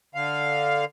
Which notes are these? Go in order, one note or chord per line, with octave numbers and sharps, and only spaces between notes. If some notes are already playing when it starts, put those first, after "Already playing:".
D3 F5